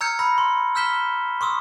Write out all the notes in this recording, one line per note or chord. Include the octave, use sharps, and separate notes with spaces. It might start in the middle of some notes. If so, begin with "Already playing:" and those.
A#5 E6 F6 G6 G#6 C#7
B5 E6 A#6
C6
E6 F6 G6 B6 E7 G7
C6 C#6 D#6 E6